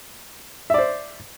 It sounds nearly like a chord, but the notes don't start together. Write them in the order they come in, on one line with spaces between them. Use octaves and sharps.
E5 D5 C5